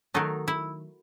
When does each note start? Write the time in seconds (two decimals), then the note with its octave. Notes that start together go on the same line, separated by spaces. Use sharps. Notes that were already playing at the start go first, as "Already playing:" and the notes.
0.14 D#3 F#3 A3 D#4
0.48 E4